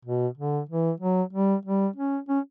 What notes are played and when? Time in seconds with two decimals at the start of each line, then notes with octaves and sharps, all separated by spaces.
0.05 B2
0.38 D3
0.69 E3
1.00 F#3
1.33 G3
1.65 G3
1.96 C#4
2.29 C#4